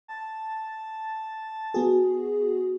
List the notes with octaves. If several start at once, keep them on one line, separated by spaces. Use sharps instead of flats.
A5
B3 F#4 G#4